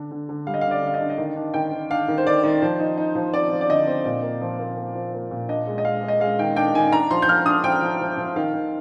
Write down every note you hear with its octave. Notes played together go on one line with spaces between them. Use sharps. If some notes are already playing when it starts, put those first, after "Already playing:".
Already playing: D3 D4
D3
D3
G3 F5
D#5
D3 F5
D5
D3 F5
D#5
D3
D#5
D#3 F5
D4
D#3 G5
D#3
D4 F5
D#3
C5
D#3 D5
D#3
F3 C5
D#4
D#4
F3
C4 D5
F3
D5
D3 D#5
C4
A#2 D5
A#3
F3
A#3
A#3
F3
A#3
A#2
D4 D#5
G#3
D#5
G#3 F5
G#3
D#5
G#3 F5
D#3 G5
D4 G5
D#3 G#5
D4 A#5
F3 C6
G6
F3 F6
D4 D#6
F3 G5
F3
F3
F3
D#3 F5
D#3